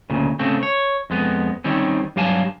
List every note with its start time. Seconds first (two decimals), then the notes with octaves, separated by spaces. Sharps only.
0.10 D2 A#2 C#3
0.39 C#3 A3 C4
0.63 C#5
1.10 F2 G#3 B3
1.64 D#3 G3 C4 C#4
2.16 G2 F#3 G4 F5 G#5 A5